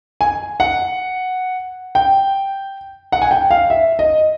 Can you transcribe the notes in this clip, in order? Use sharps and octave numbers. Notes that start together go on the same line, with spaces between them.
G#5
F#5
G5
F#5
G#5
G5
F5
E5
D#5